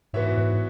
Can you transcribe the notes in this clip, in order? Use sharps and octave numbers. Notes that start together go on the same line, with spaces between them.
G#2 E3 B3 F#4 C#5 E5
G#2